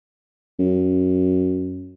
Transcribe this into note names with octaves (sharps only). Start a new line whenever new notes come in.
F#2